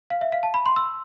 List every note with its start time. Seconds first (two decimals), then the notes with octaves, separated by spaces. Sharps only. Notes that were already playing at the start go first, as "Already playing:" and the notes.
0.10 F5
0.21 E5
0.32 F5
0.43 A5
0.54 B5
0.66 C6
0.76 E6